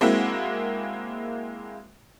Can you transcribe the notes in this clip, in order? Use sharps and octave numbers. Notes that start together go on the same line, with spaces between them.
G#3 A#3 C4 E4 F#4